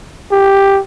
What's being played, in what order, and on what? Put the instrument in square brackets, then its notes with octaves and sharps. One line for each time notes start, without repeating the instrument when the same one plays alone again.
[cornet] G4